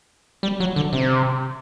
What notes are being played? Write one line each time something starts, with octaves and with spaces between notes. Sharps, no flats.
G3
F#3
D3
C3